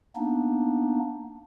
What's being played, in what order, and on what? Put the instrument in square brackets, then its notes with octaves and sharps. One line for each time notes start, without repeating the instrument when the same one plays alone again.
[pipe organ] A#3 B3 D4 D#4